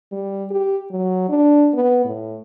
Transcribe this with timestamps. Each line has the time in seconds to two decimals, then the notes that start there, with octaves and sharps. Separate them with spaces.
0.12 G3
0.51 G4
0.91 F#3
1.29 D4
1.74 B3
2.05 A2